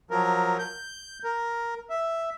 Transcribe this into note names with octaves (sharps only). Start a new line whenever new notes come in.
F3 F#3 A#4
G6
A#4
E5